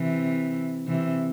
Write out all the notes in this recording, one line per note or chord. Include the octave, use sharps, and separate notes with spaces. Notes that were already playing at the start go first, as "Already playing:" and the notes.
Already playing: C3 E3
C3 E3